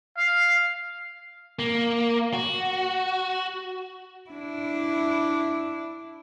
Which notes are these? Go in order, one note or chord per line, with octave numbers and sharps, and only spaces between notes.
F5
A#3
F#4
D4 E4